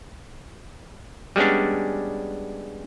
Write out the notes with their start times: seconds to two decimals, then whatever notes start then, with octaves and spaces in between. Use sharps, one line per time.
1.36 G3 G#3 B3 C#4 D4